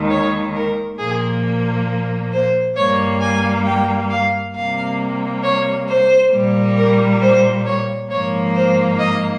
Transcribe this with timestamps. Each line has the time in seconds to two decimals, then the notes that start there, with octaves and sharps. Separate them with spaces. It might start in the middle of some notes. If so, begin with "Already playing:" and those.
Already playing: D#2 D#3 G#3
0.10 C#5
0.55 A#4
0.98 A#2 F3 A#3 G#4
2.32 C5
2.76 G2 G3 A#3 C#5
3.21 G#5
3.66 G5
4.11 F5
4.54 C3 G3 A#3 F5
5.43 C#5
5.88 C5
6.32 A#2 G3 A#3
6.77 A#4
7.21 C5
7.66 C#5
8.10 G#2 F3 A#3 C#5
8.55 C5
8.99 D#5